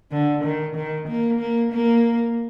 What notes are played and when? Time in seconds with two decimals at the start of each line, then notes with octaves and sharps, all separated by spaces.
0.12 D3
0.44 D#3
0.76 D#3
1.08 A#3
1.40 A#3
1.72 A#3